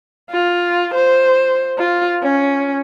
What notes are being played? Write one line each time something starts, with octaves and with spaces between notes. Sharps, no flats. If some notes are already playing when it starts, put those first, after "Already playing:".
F4
C5
F4
C#4